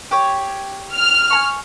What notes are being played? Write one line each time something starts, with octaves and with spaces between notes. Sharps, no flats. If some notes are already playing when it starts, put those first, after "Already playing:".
G4 C#5
F6
G#5 A#5 C#6